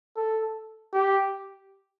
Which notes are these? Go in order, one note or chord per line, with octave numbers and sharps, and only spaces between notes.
A4
G4